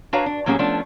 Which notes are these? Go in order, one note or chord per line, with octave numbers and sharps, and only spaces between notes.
D4 F#4 B4 C#5 F5 A#5
D4
A2 F#3 A#3 C#4 G4 G#4
F3 A3 B3 C#4 D4